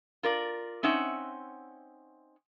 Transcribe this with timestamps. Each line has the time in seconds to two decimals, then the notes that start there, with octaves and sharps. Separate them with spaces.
0.23 F4 A#4 D5
0.83 C4 C#4 D#4 E5 F#5